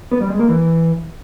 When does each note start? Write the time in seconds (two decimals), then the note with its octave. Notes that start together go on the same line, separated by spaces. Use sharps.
0.11 B3
0.21 G3
0.30 G#3
0.39 A#3
0.49 E3